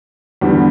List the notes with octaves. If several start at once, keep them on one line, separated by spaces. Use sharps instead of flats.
E2 D3 G3 B3